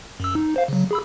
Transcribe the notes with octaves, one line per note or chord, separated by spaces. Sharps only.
F#2 E6
D#4
C5 F5
C#3 F#3
G#4 B5 E6